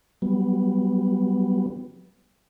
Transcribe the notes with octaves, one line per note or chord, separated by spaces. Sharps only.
F#3 G3 B3